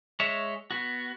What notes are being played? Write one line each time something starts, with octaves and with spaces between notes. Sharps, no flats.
G#3 C#5 E5
B3 F#4